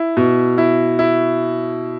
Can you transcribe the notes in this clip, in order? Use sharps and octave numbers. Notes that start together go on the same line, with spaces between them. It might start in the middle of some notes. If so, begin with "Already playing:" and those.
Already playing: E4
B2
E4
E4